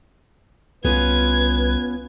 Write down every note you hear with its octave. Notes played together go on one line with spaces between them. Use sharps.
C2 B3 C#4 F4 B4 G#6